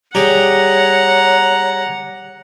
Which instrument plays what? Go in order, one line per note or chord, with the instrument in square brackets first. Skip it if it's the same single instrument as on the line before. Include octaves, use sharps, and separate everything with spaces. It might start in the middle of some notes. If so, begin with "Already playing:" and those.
[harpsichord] G3 G4 G#4 [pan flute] C#5 [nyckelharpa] F#5 [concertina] A#5